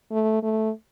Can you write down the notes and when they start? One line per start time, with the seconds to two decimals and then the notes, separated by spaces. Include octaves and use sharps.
0.11 A3
0.43 A3